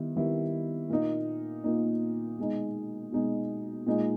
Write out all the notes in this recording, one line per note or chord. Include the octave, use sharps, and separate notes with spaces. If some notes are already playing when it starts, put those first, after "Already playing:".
Already playing: D#3 G3 B3 E4
D#3 G3 B3 E4
A#2 A#3 D#4
A#2 A#3 D#4
B2 G#3 D#4
B2 G#3 D#4
A#2 G#3 D#4